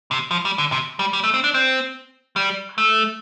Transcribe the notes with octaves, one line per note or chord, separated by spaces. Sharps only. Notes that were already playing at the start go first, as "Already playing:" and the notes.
C3
F3
G3
D3
C3
G3
G3
A3
C4
D4
C4
G3
A3